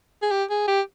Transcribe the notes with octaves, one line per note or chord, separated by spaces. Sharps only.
G#4
G4
G#4
G4